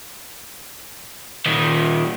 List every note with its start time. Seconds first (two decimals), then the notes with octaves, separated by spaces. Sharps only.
1.46 A#2 D#3